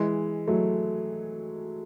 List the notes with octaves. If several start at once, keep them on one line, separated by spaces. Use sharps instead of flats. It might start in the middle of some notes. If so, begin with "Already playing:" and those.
Already playing: E3 G#3
F#3 A3